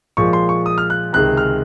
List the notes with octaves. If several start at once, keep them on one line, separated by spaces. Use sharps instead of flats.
A#2 F3 G#3 C#6
C6
C#6
D#6
F6
F#6
C#2 C3 D#3 G#3 F#6
F6